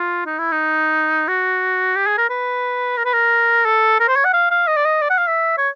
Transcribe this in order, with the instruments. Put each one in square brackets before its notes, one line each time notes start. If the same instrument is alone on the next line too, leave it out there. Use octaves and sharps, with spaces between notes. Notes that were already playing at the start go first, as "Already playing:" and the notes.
Already playing: [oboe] F4
D#4
E4
D#4
F#4
G4
G#4
A#4
B4
A#4
B4
A#4
A4
A#4
C5
C#5
F#5
F5
F5
D#5
D5
D#5
D5
F#5
F5
E5
C#5